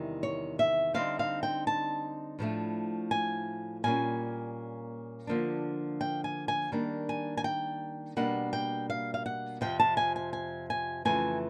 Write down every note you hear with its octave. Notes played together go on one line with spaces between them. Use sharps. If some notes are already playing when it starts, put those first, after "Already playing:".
Already playing: E2 C3 D#3 G3 C4
C#5
E5
D3 G3 C4 D#4 F5
F5
G5
A5
A2 F3 A3 D4
G#5
A#2 G3 A#3 C#4 G#5
D3 F3 A#3 D4
G5
G#5
G#5
D#3 G3 A#3 D4
G#5
G#5
G5
B2 G3 A#3 D4 F#5
G5
F5
F5
F#5
F2 C3 F3 G5
A5
G#5
G#5
G#5
G#5
F2 C#3 E3 A3 G#5